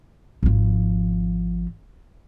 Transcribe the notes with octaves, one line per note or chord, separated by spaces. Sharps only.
G#1 F3